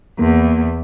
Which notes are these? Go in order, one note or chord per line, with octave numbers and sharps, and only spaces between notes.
E2 A#3